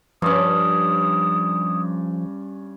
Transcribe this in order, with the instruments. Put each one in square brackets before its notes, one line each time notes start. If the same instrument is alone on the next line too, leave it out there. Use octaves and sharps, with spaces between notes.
[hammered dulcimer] G2 C#4 [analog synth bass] F3 [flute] D#6